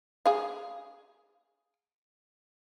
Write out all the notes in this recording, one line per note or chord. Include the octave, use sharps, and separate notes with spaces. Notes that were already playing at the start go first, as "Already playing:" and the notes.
G#4 F5